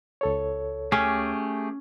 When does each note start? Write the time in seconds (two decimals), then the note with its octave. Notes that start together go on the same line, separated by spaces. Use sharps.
0.21 C#2 A4 C#5
0.92 A3 C#4 G4 G#4